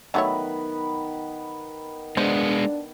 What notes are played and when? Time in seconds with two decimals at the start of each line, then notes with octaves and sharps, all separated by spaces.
0.14 D#3 F#3 A3 B3 B4 C#5
2.17 G#3 B3 D4 C5